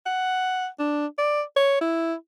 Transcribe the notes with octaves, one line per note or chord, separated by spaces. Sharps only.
F#5
D4
D5
C#5
E4